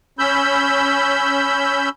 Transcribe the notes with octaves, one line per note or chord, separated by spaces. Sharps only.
C#4 B5 E6 G6